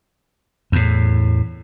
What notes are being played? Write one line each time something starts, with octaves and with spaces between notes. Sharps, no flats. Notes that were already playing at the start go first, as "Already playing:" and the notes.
E2 A2